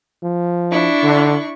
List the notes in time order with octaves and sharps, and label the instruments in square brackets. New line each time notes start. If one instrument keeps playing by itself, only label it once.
[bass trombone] F3
[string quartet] D4 E4 C#6
[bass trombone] D3